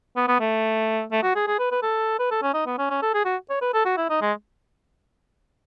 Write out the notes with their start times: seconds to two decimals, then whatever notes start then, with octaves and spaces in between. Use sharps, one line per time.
0.16 B3
0.28 B3
0.40 A3
1.11 A3
1.23 F#4
1.35 G#4
1.47 G#4
1.59 B4
1.72 B4
1.82 A4
2.19 B4
2.31 A4
2.42 C#4
2.54 D#4
2.66 B3
2.78 C#4
2.90 C#4
3.02 A4
3.14 G#4
3.25 F#4
3.50 C#5
3.61 B4
3.73 A4
3.85 F#4
3.97 E4
4.10 D#4
4.21 G#3